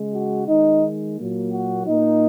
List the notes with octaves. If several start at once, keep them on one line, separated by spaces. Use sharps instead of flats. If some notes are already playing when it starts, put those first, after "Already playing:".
Already playing: C#3 G#3
F#4
D#3 G#3 D#4
A#2 F#3 A#3
F#4
A#2 A#3 D#4